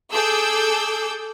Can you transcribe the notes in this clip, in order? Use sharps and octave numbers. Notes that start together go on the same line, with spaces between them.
G#4 A4 D6 E6 G6